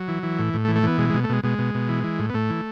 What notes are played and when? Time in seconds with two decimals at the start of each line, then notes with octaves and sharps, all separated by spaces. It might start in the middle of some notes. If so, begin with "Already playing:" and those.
Already playing: F#3
0.08 E3
0.23 E3
0.39 A2
0.54 A2
0.65 A3
0.68 E3
0.75 A3
0.83 E3 B3
0.98 B2 G#3
1.10 B2 G#3
1.24 A3
1.29 B2 G#3
1.43 B2 G#3
1.58 B2
1.74 B2
1.89 E3
2.04 E3
2.19 A2
2.30 B3
2.34 A2 A3
2.50 E3